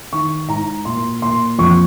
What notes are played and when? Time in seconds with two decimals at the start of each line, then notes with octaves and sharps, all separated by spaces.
0.13 D#3 C#6
0.49 G#2 A#5
0.85 A#2 C6
1.22 A#2 C6
1.59 F2 C#6